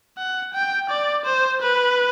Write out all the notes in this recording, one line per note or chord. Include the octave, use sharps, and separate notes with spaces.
F#5
G5
D5
C5
B4